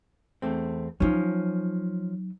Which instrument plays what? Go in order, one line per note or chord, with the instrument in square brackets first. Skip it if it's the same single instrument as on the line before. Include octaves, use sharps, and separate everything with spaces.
[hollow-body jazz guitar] E2 A3 C4
[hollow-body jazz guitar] F3 C#4 [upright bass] F#3 D#4